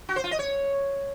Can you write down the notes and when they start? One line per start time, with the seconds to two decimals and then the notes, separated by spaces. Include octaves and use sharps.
0.09 F#4
0.16 C5
0.24 F4
0.31 D#5
0.39 C#5